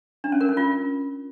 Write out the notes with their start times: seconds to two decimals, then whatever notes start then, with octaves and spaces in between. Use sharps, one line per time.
0.24 D4
0.32 C#4
0.41 A#4
0.49 C#4
0.57 F4